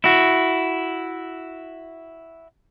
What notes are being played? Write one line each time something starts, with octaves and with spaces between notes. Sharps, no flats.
E4 F#4